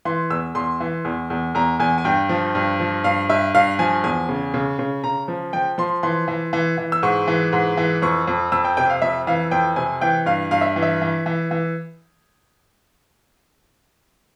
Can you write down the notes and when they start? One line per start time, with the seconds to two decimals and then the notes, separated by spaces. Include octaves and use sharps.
0.05 E3 C6
0.30 E2 E6
0.55 E2 C6
0.80 E3
1.05 E2
1.30 E2
1.55 E2 A#5
1.79 E2 G#5
1.98 G#5
2.05 G2 G5
2.29 F3
2.55 G2
2.80 F3
3.04 G2 F5
3.29 G2 E5
3.54 G2 F5
3.79 F3 G#5
4.04 E2 G#5
4.29 C#3
4.54 C#3
4.79 C#3
5.04 C#3 A#5
5.28 F3
5.53 F3 G5
5.78 F3 C6
6.03 E3 C6
6.28 E3
6.53 E3
6.78 E3
6.92 E6
7.03 G#2 C#6
7.28 E3
7.53 G#2
7.77 E3
8.02 F2 C#6
8.27 F2
8.52 F2 E6
8.65 G5
8.77 C3 G5
8.90 F5
9.02 F2 E5
9.27 E3 F5
9.51 F2 G5
9.76 C3 G#5
10.01 E3 G5
10.26 G2 F5
10.51 G2 F5
10.61 E5
10.76 E3
10.82 E5
11.02 E3
11.26 E3
11.51 E3